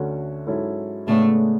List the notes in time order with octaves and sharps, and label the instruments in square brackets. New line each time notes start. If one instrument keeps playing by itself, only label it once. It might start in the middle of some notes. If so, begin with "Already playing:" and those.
Already playing: [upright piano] D2 D3 A3 C#4 F#4
G#2 F#3 C#4 E4 A4
[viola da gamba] A2 A3 [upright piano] C#3 G#3 B3 D4